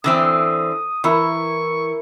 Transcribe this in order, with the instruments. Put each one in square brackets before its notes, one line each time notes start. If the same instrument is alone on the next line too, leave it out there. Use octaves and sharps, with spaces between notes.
[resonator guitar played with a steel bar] D3 E3 C4 [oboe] D#6
[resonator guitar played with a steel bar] E3 [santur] E4 A#4 E5 [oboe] C#6